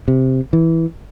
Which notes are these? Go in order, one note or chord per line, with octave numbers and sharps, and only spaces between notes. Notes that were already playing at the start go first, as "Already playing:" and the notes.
C3
E3